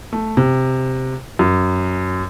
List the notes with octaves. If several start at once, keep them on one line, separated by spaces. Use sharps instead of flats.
A3
C3
F#2